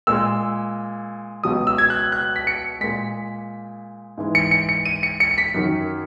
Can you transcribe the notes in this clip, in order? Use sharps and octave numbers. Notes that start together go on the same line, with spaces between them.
A#2 G#3 E6
C#2 B2 F#3 D#6
E6
G#6
F#6
F#6
B6
C#7
A#2 G#3 B6
G#2 E3 G#3
C#7
C#7
C#7
D#7
C#7
C#7
C#7
B6
F#2 D#3 F#3